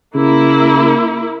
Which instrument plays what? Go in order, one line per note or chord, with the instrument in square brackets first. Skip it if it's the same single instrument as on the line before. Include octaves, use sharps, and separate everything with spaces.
[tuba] C#3 [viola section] A#3 E4